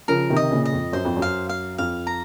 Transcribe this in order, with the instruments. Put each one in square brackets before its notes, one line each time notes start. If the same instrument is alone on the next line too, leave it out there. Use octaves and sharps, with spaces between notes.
[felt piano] C#3 F3 [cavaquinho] A#4
[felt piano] C3 D#3
[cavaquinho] D#5
[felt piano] A#2 C#3
[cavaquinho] D#5
[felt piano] F2
[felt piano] F#2 [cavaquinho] C5
[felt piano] F2
F#2
[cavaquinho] F5
F5
[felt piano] F2 [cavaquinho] F5
[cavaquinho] A#5